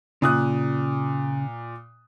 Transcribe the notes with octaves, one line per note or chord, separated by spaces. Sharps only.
A#2 C#3 D#6 F#6